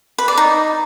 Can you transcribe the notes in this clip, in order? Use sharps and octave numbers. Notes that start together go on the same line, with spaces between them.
B4
D5
D#4